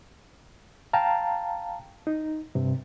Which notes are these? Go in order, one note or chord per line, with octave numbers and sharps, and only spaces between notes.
F5 G5 A5 A#5
D#4
G2 C3